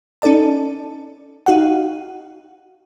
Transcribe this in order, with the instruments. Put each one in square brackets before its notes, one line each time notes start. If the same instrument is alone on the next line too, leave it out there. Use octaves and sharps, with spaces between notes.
[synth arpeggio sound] C#4 D#4 A4 D5 A5
D#4 F#4 F5 F#5